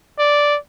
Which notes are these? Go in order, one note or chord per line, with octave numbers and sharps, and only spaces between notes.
D5